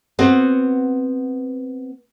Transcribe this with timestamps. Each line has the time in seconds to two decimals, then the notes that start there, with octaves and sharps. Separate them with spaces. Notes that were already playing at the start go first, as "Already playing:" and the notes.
0.19 B3 C4 F#4